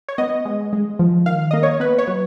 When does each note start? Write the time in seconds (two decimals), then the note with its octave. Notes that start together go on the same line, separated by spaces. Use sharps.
0.08 C#5
0.18 B3 D#5
0.45 G#3
0.73 G#3
0.99 F3
1.26 D#3 F5
1.51 A#3 D#5
1.63 C#5
1.80 B3 B4
1.98 C#5
2.07 F#3